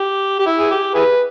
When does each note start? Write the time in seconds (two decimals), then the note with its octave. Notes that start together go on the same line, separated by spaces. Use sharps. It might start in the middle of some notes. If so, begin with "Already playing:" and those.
Already playing: G4
0.40 G4
0.46 E4
0.59 G#4
0.71 G4
0.95 E4 G#4 B4